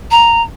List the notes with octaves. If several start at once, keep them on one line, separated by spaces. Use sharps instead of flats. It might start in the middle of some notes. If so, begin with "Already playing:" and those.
A#5